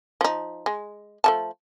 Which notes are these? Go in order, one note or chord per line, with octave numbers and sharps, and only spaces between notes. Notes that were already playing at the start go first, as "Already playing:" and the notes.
F3 D#4
G#3
F3 A3 A5